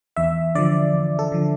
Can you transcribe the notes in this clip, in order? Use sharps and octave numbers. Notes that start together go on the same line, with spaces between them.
E2 E5
D3 F3 D5
E2
A4
D3 F3